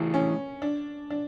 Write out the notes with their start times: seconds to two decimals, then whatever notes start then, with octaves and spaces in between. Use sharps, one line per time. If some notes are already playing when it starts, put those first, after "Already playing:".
Already playing: E3 A3 E4 G#4
0.14 C#4
0.62 D4
1.10 D4